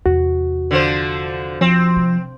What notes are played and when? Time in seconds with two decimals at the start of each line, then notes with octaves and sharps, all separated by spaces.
0.06 E2 C3 F#4
0.71 D3 F3 C5
1.61 F3 C4
1.97 C3